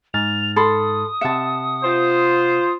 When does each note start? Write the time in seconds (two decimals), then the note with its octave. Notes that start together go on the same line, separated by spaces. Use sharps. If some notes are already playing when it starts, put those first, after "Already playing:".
0.14 G#2 F6 A6 F7
0.56 A4 B5 C6 D#6
1.21 C3 E5 F#5 A5 C#7
1.83 F4 C5